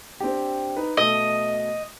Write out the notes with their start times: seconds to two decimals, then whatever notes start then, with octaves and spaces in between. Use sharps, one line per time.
0.20 C4 D4 G4
0.77 D#4 B4
0.97 B2 A3 D#5